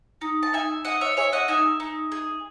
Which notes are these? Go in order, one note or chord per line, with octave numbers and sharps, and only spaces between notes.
D#4
A5
D#4 E5 G#5
G#4 D#5 F#5
C#5 E5
G#4 C#5 E5
D#5 F#5
D#4 E5 G#5
D#4
G#4